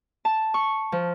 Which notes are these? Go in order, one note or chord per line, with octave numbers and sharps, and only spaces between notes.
A5
C#6
F3